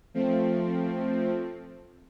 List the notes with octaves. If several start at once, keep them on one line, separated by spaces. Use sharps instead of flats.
F3 A3 C4